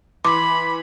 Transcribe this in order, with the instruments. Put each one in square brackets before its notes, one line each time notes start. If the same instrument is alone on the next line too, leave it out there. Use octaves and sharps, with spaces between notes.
[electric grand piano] E3 [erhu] B5 [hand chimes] C6 [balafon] D6